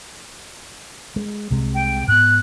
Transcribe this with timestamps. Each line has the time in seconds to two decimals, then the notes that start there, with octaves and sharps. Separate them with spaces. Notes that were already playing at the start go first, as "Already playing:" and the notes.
1.16 G#3
1.50 C2 C3 G#3
1.74 G5
2.08 G#2 B3 F#6